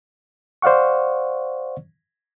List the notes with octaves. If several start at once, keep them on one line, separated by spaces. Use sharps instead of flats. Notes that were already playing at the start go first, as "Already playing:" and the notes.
C5 D5 F5 F#5 C#6